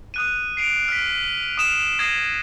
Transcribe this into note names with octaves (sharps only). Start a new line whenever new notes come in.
D#6 F#6 D#7
C7 D7 F7
F6 B6
D#6 F6 E7
D#6 G#6 A#6 C7 D#7 E7